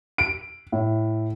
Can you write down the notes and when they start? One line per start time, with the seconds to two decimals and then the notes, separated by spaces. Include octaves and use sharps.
0.18 D7
0.72 A2